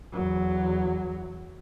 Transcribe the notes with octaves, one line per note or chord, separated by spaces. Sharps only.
E2 F#3